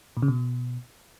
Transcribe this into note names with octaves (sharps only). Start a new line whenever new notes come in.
A#2
C#3
B2